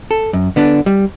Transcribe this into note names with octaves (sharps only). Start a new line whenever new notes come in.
A4
F#2
D3 B3 D4
G3